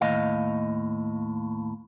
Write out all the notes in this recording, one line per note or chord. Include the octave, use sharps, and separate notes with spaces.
D#2 A2 D#5 F5